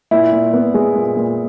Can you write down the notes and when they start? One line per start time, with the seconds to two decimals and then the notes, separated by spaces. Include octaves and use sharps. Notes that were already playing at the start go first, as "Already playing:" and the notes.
0.11 A#2 E4
0.32 A#2
0.53 B3
0.74 G#3
0.96 A#2
1.17 A#2